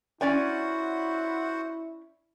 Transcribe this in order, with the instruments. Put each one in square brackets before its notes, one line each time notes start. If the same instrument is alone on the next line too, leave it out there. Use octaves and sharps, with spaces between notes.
[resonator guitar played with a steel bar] C#4 D5 G#5 [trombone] E4 [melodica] F#4 C5 F#5